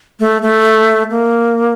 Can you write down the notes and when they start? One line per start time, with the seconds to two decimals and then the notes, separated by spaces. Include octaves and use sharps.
0.20 A3
0.42 A3
1.10 A#3